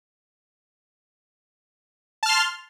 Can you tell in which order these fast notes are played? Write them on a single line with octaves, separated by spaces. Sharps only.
A5 F6 C6